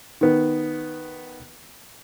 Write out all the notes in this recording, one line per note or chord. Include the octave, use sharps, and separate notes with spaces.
D#3 B3